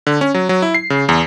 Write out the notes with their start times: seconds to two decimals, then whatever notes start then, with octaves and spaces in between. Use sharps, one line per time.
0.07 D3
0.21 C#4
0.34 F#3
0.49 F#3
0.62 E4
0.74 C7
0.90 C#3
1.09 E2